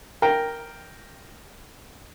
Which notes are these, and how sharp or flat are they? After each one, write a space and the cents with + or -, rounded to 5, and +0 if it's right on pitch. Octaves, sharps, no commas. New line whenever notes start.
A#4 +0 G5 +0